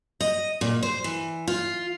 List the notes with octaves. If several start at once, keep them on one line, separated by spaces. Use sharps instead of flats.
D#5
A#2
C5
E3
F4